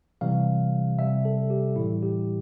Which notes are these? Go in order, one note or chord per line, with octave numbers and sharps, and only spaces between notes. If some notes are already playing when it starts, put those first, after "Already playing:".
C3 E3 G3 F5
C3 G3 E5
A4
G4
A2 E3 G3 E4
G4